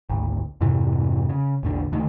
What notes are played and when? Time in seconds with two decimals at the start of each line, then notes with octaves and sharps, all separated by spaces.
0.09 G#1 D2
0.61 F2 G#2 C3 E3
1.29 C#3
1.63 A#1 E2 D3
1.92 D#2 D3 D#3 A3